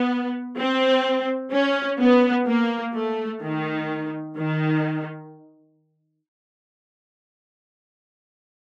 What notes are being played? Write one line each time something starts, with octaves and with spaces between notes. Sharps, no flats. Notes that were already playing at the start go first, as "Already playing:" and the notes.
Already playing: B3
C4
C#4
B3
A#3
A3
D#3
D#3